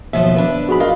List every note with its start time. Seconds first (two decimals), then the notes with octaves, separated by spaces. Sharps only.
0.13 D#2 B2 F3 E5
0.36 D4 B4
0.69 F#4 G#4 B5
0.80 F4 A#4 D#5